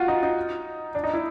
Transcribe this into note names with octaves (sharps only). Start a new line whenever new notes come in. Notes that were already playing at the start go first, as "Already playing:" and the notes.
Already playing: F4 F#4
D#4
D#4
D4
D#4
E4